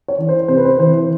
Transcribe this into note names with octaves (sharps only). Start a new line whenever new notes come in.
C#5
E3
C5
C3 C5
B4
C5
E3 C5